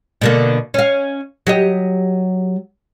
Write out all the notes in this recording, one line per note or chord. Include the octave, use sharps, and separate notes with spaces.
B2 D3 A#3
C#4 F5
F#3 G4 D#5